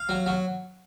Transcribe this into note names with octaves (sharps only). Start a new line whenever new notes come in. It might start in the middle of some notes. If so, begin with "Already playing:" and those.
Already playing: F5
F#3
F#3